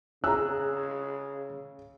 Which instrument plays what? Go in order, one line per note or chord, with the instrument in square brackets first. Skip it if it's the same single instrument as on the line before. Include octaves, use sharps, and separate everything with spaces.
[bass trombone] C#3 [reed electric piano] G#4 F#6 [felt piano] A#5 E6